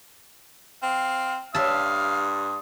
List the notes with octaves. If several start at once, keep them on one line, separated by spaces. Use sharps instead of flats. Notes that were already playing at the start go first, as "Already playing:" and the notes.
C4 F5
G2 D5 E5 F5 A5 C6 D#6